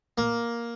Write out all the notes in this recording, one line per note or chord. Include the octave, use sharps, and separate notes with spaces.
A#3